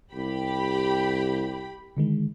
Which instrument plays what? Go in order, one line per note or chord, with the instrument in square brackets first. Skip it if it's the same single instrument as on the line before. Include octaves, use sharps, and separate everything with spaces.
[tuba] C2 [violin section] G4 B5
[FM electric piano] D3 D#3 G#3